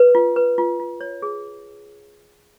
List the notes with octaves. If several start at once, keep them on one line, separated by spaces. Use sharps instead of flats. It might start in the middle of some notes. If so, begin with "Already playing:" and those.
Already playing: B4
F4
B4
F4
F4
C#5
G#4